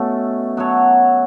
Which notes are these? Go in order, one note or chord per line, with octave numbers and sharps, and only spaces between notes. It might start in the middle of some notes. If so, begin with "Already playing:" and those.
Already playing: B2 A3 C#4 A4
F#3 B3 A4 C#5